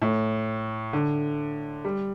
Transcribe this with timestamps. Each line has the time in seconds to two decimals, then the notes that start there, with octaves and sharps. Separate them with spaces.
0.02 A2
0.93 D3
1.85 G3